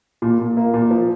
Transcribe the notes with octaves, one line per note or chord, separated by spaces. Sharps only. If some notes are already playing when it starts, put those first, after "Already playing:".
A#2
A#2
A#3
A#2
F3